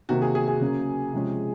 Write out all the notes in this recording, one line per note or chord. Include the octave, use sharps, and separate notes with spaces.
C3 D#3 A#3 F#4
G#4
G#4
G#4
C#3 F#3 A#3 C#4
C3 F3 G#3 C#4